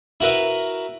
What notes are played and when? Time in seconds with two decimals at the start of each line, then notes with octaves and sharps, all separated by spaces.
0.20 E4 F#4 A#4 B4 E5